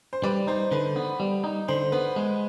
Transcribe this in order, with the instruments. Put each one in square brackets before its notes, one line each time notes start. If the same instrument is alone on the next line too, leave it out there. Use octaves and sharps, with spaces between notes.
[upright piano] C5
[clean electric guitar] G3 [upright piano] B4 D5
[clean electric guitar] D#4 [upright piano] C5
[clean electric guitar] D3 [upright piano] B4
[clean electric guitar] B3
G3
D#4
[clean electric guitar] D3 [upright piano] C5
[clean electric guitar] B3 [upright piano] B4
[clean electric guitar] G#3